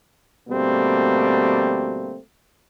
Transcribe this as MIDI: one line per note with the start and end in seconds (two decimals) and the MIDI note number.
0.49 2.18 38
0.49 2.18 47
0.49 2.18 55
0.49 2.18 57
0.49 2.18 58
0.49 2.18 60